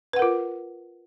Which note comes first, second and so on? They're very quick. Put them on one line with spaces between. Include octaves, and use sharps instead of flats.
B4 F#5 A#4 F4